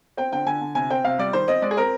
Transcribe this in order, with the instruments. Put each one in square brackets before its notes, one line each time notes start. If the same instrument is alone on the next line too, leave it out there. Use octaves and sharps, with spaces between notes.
[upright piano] C4 G5
D3 G5
D3 G#5
D3
C3 G#5
C4 G5
C3 F5
G3 D5
D#3 C5
C4 D#5
G#3 D5
G#4
C4 A#4